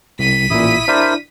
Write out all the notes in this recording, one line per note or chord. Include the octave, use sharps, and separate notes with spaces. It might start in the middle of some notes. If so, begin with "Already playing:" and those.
C2 B6 D#7
A1 A#2 E4 D#6
D4 E4 A#4 C5 D5